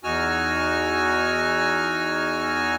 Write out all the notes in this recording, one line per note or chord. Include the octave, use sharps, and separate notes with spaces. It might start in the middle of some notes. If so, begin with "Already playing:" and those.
E2 D#4 F#4 G#5 E6 F6